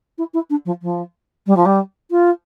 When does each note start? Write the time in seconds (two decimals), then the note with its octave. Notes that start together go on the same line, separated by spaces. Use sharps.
0.18 E4
0.33 E4
0.50 D4
0.65 F3
0.82 F3
1.46 G3
1.56 F3
1.65 G3
2.10 F4